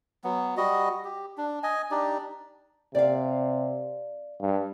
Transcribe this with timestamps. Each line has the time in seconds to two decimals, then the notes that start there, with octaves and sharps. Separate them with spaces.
0.24 F#3 B3
0.57 G3 F#4 D#5
1.04 G4
1.37 D4
1.63 D#5 G#5
1.91 D4 D#4 G4 D5
2.95 C3 D5 F5
4.41 G2